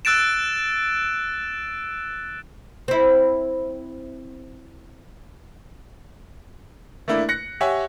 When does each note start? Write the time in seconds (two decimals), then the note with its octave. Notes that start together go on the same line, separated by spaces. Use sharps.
0.05 E6 F#6 A6 D7 E7
2.88 C4 E4
7.08 A3 A#3 D4 E4
7.29 F#6 A#6 C#7
7.61 G4 C#5 E5 F#5 G#5